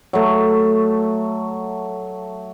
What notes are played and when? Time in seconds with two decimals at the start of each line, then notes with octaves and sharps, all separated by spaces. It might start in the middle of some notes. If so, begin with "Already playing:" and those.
0.13 F#3 A3